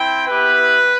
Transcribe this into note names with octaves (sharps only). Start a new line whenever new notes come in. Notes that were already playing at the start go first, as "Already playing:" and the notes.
Already playing: C4 E4 G5
B3 E4 G4 B4